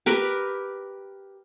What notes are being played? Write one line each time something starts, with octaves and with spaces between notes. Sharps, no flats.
G4 A#4 B4